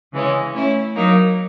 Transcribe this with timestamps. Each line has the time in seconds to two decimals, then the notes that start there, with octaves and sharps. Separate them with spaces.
0.12 C#3 E3 G#3 C#4
0.53 A3 C#4 E4
0.95 F#3 A#3 D#4